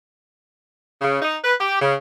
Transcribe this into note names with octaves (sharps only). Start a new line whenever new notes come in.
C#3
D#4
B4
G4
C#3